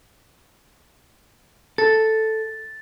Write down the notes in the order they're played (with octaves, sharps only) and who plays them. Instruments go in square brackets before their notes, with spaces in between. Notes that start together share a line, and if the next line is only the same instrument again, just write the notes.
[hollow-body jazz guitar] A4 [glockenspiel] A6